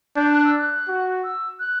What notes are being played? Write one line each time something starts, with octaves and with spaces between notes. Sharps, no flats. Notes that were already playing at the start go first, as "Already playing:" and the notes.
D4 G6
F#6
E6
F#6
F#4
E6
F#6